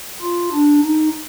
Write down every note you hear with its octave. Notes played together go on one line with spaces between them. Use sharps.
F4
D4
D#4